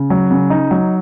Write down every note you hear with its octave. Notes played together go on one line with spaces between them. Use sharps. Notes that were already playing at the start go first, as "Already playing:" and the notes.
Already playing: C#3
F#3
C#3
D#4
F#3